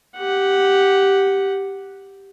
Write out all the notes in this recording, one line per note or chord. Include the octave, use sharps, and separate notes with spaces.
G4 F#5